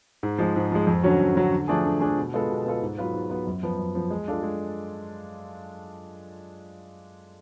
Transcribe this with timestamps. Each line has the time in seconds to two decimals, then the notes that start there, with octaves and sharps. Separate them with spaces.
0.23 G#2
0.38 F3 G#3
0.56 G#2
0.72 F3 G#3
0.87 F2
1.04 D3 F#3 C#4 F#4
1.20 F2
1.36 D3 F#3 C#4 F#4
1.53 D3
1.68 F3 A3 D4 G#4
1.85 D3
2.00 F3 A3 D4 G#4
2.17 B2
2.34 G#3 B3 F4 A4
2.49 B2
2.65 G#3 B3 F4 A4
2.82 G#2
2.98 F#3 B3 F4 B4
3.13 G#2
3.30 F#3 B3 F4 B4
3.47 F#2
3.63 F3 B3
3.79 F#2
3.95 F3 B3
4.10 G#3
4.28 D4 F4 A4
4.43 G#3